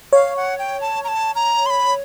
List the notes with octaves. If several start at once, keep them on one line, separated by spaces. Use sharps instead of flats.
C#5 F5
F#5
G5
A5
A#5
A5
A#5
C6
B5